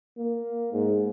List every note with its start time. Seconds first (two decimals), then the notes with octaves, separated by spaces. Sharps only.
0.18 A#3
0.72 G#2